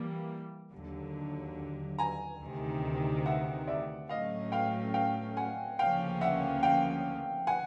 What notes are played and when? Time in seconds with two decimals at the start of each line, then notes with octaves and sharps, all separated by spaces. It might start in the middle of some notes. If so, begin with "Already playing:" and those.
Already playing: E3 G3 A#3
0.72 D#2 D3 F#3
1.98 G#5 A#5
2.41 D2 C3 D#3
3.26 E5 F#5
3.67 D5 E5
4.09 A2 F#3 A3 C#4 D#5 F5
4.52 F5 G5
4.94 F5 G5
5.37 F#5 G#5
5.79 D2 C#3 F3 A#3 C#4 F5 G5
6.21 E5 F#5
6.63 F5 G5
7.47 F#5 G#5